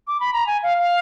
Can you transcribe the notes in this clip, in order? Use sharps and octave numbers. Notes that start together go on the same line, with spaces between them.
D6
B5
A#5
G#5
F5
F5